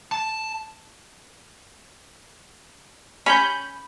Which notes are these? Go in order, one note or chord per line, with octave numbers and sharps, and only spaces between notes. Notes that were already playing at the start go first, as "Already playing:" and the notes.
A5
C#4 B5 G6